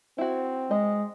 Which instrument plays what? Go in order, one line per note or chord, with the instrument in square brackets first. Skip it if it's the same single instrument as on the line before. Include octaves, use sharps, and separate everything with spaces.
[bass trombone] C4 [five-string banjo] E4 F#4
[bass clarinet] G#3 [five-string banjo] D#5